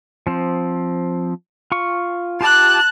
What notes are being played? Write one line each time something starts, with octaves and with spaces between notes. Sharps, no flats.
F3 C4
F4 C#6
F4 G4 A5 D6 F#6